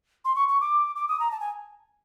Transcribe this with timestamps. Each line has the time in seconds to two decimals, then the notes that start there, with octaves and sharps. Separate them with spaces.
0.25 C6
0.36 C#6
0.48 C#6
0.61 D6
0.96 D6
1.08 D#6
1.20 A#5
1.31 A5
1.40 G#5